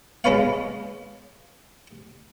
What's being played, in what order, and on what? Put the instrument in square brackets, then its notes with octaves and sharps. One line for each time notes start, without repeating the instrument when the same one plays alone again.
[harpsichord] G#3 C#4 B4 C#5 F5